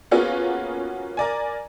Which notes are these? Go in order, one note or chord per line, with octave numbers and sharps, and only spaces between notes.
A#3 B3 C#4 F4 F#4 G#4
A#4 D5 G#5